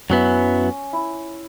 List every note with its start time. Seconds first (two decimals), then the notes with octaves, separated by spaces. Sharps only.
0.10 F#2 F#3 B3 C#4 E4
0.93 E4